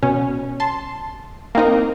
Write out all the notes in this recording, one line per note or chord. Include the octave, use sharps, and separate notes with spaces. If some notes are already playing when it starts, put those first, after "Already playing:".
B2 C#4
A5 C6
A#3 C4 D#4 A#4